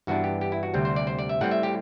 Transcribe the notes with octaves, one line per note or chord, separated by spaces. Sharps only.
G2 E3 B3 D4 F#4
G4
G4
E4
F#4
D2 C3 G3 C4
C5
D5
C5
D5
E5
A2 G3 C4 F#5
E5
G4